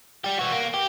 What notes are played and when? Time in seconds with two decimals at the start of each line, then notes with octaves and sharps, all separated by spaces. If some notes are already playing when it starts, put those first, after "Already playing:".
0.24 G3 G4
0.39 E3 F#4
0.52 A#3
0.74 G4